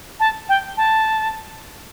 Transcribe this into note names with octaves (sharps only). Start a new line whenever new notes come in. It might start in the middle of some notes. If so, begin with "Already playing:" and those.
A5
G5
A5